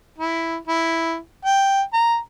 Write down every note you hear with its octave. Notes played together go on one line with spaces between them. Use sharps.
E4
E4
G5
A#5